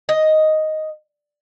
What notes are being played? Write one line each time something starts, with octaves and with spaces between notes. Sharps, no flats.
D#5